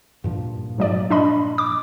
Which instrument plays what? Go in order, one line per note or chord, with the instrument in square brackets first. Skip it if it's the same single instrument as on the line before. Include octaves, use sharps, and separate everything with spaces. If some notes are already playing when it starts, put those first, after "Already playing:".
[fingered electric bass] G2 A#2 F3
[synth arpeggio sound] G#2 F#3 D5
D4 D#5 B5
D6